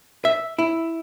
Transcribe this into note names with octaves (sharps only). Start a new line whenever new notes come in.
E5
E4